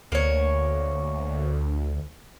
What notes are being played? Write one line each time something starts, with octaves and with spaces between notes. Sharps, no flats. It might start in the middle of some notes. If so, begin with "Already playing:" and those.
D2 A#3 C#5